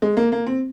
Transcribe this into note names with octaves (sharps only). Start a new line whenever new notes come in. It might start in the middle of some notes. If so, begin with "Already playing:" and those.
G#3
A#3
A#3
C4